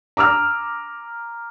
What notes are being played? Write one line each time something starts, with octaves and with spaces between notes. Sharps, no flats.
A#5 D6 E6 F6